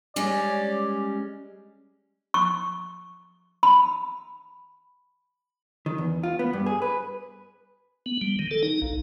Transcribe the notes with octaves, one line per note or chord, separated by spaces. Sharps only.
G3 G#3 C#4 D5
C#6
B5
D#3
E2
F4
B3
G2
G#4
B4
B3
G3
D#3
A4
D#4
A#1